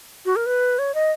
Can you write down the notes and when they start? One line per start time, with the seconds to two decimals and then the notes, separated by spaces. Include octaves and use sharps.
0.26 F#4
0.36 A#4
0.46 B4
0.79 C#5
0.94 D#5